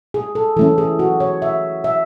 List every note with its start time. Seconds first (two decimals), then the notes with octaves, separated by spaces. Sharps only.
0.14 G#4
0.35 A4
0.56 E3 A3 C#4 A4
0.78 G#4
0.99 F#4
1.20 C#5
1.42 E5
1.84 E5